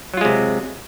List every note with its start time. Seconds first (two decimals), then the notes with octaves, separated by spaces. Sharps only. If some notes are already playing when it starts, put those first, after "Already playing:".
0.14 F#3
0.17 F4
0.21 G#3
0.25 C3